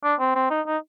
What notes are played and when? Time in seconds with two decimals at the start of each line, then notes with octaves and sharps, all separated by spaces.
0.04 D4
0.20 C4
0.35 C4
0.50 D#4
0.67 D#4